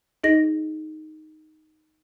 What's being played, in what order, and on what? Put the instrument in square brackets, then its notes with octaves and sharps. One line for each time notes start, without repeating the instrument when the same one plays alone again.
[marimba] D#4 G#4 D#5 A#6